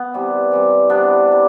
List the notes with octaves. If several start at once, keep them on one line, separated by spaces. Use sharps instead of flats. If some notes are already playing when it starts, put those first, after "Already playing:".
Already playing: B3
C3 E3 G3
C3 E3 G3
C3 E3 G3 B3 D4
C3 G3